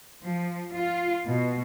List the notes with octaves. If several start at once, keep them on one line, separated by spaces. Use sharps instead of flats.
F3
F4
B2